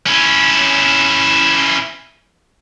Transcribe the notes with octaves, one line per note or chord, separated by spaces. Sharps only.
C#4 E4